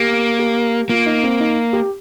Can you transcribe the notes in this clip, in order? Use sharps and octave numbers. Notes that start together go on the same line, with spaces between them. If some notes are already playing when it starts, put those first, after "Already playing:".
Already playing: A#3 G4
G4
A#3 F4
D#4
C4
D#4
G4